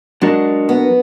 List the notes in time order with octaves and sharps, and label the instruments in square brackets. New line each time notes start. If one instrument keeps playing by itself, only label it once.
[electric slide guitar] F#3 D4 F#4 A#4 [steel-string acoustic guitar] G#3
[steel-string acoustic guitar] B3